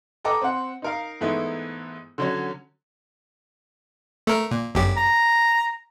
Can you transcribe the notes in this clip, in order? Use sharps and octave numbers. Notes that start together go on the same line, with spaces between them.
A4 B4 D#5 G5 A#5 D6
C4 F#5
D#4 A#4 F5
G#2 E3 A3 B3 D#4 E4
D3 F#3 C#4
A3 A#4
A#2
G1 F#2 G4
A#5